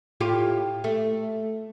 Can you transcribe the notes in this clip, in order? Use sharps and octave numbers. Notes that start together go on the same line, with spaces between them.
A2 F4 G4
A3